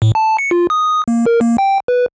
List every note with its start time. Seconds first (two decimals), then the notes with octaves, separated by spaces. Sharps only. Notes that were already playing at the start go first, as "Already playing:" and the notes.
0.02 A2
0.15 A5
0.38 C#7
0.51 F4
0.70 D#6
1.08 A#3
1.26 A#4
1.41 A#3
1.58 G5
1.88 B4